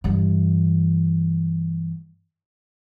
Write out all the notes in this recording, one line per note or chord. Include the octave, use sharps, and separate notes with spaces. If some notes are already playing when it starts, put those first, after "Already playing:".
G2 E3